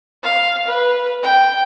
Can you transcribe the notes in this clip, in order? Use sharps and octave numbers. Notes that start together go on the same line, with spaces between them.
F5
B4
G5